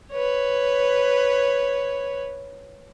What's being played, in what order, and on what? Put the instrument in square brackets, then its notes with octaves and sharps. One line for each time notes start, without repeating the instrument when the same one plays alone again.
[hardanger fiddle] B4 C#5